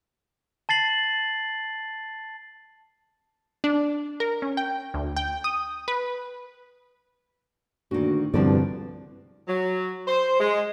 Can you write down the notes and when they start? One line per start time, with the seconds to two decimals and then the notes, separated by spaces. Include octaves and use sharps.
0.69 A5 A6 C7 F#7
3.64 D4
4.20 A#4
4.42 C#4
4.57 G5
4.94 D2
5.17 G5
5.44 D#6
5.88 B4
7.91 D2 A#2 D#3 F#4
8.34 C2 G2 B2 D3 F3 D5
9.48 F#3
10.07 C5
10.39 G#3